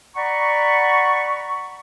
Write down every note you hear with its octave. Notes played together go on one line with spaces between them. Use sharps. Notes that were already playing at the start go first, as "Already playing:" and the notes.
D5 F#5 A#5 B5 C#6